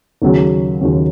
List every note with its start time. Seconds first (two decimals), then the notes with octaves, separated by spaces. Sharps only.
0.22 D#2 C#3 F#3 C#4
0.80 D#2 C#3 F#3 C#4